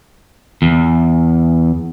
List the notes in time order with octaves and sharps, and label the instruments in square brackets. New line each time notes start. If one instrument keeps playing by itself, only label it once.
[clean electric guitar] E2